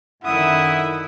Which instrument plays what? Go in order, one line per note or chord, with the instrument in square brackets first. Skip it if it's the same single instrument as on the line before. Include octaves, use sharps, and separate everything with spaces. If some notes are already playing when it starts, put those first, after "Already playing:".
[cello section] F#2 D3 D#3 [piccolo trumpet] E4 [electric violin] E5 D#6 [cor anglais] F#5